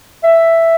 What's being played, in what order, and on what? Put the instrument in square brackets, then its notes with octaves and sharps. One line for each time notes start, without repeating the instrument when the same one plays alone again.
[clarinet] E5